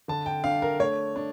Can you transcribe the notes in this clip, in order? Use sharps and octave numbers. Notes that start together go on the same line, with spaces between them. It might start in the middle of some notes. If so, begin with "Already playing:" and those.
D3 A5
G5
D4 F5
A#4
A3 C#5
D4